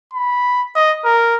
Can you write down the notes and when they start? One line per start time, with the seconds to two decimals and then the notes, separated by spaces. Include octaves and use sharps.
0.14 B5
0.75 D#5
1.04 A#4